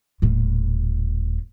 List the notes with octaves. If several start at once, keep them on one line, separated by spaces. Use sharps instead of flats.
D#1 A2